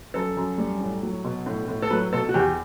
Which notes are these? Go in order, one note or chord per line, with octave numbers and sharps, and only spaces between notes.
F#2 A4
F#2
G3
A2
F#3
B2
A2
A2
A4
F#3 B4
B2 A4
F#4
E2 G4